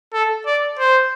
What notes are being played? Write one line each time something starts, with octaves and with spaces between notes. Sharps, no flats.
A4
D5
C5